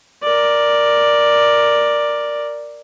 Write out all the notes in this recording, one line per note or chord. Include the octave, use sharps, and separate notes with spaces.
A#4 D5